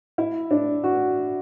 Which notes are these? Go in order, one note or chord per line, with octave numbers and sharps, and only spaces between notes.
E4
D4
F#4